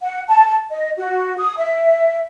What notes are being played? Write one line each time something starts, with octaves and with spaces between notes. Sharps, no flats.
F#5
A5
D#5
F#4
D#6
E5